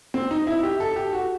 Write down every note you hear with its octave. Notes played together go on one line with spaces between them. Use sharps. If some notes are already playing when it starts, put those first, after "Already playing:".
C4
D#4
E4
G4
A4
G4
F#4